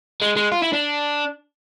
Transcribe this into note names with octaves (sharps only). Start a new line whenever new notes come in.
G#3
G#3
F4
E4
D4